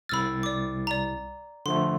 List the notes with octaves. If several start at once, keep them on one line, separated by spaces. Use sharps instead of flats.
C2 B5 E6 F6 A6
D5 D6
D5 A#5
D3 F3 A3 C6